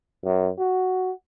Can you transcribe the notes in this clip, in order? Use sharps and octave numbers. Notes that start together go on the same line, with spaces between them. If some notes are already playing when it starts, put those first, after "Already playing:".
F#2
F#4